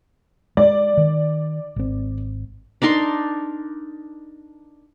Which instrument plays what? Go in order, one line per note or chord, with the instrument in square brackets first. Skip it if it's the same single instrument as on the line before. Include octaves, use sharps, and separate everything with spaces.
[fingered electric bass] G#3 [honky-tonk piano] D5
[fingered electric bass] D#3
G#1 C4
[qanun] D4 D#4 A#4 C6